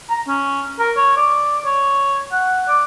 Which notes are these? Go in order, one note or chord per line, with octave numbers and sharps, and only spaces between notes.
A#5
C#4
A#4
C#5
D5
C#5
F#5
D5